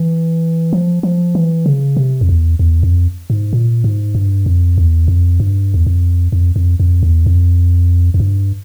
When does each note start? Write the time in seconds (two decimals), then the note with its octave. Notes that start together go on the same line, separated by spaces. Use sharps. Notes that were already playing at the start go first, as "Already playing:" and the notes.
Already playing: E3
0.73 F3
1.03 F3
1.35 E3
1.66 C#3
1.97 C3
2.21 F2
2.29 E2
2.59 E2
2.83 F2
3.30 G#2
3.53 A#2
3.84 G#2
4.15 G2
4.46 F2
4.78 E2
5.08 F2
5.40 G2
5.74 E2
5.87 F2
6.32 F2
6.56 F2
6.80 F2
7.03 E2
7.26 F2
8.14 F2
8.20 G2